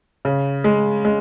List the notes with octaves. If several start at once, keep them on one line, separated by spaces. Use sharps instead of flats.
C#3
G#3
G#3